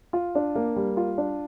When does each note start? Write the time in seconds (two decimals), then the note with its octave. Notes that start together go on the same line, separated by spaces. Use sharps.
0.13 F4
0.35 D4
0.55 A#3
0.76 G3
0.97 F4
1.18 D4